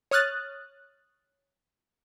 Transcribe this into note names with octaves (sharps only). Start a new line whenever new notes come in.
C#5 D#6 F6 F#6 A6